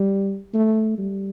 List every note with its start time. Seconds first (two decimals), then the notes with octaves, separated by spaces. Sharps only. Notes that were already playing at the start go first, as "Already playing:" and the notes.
Already playing: G3
0.54 A3
0.98 G3